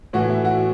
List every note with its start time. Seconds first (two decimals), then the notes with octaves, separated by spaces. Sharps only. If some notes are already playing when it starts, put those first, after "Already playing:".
0.13 A2 E3 F#4
0.30 E4
0.45 F#4